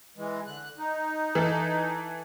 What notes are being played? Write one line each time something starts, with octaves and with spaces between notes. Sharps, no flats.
E3 G#3
D3 F#6
D#4
E3 A4